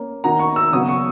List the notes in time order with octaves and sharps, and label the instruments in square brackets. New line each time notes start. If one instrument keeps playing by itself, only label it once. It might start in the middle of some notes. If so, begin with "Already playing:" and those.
Already playing: [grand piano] A#3 C#4
[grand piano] D#3 A#3 D#4 F#4 [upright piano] A#5
[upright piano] C#6
E6
[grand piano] C#3 F#3 B3 F#4 [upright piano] D#6
[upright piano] C#6